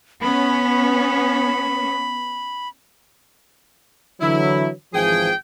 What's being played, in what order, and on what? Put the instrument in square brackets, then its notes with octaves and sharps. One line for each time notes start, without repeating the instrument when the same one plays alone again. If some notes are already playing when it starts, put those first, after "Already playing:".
[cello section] B3 C#4 [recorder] B5
[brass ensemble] D3 E3 F#3 [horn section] E4
[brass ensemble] G#1 E3 F3 [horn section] G#4 G5